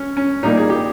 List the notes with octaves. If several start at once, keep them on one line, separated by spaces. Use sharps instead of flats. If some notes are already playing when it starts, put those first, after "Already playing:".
Already playing: C#4
C#4
A#2 G3 A#3 D#4
G#4
G4